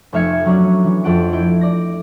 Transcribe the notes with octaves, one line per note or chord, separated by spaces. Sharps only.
F1 A3 E5 F6 G#6 C#7
F#3 C#4 D4
E3
F2 A4 F#5 D7
E4 G6 D7
D5 A#6